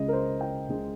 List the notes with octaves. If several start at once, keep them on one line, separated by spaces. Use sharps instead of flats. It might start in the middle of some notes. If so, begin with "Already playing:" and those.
Already playing: C#2 C#3 G#3 D#5
A#4
C5
G5
C#2 C#3 G#3